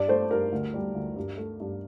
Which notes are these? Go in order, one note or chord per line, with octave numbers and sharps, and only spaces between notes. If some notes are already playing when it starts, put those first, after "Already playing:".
Already playing: G2 D5
A3 C5
G2 A#4
D2
G3
D2
G2
A3
G2